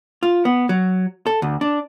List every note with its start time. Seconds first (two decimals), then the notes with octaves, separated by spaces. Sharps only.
0.23 F4
0.45 B3
0.69 F#3
1.26 A4
1.42 D2
1.61 D4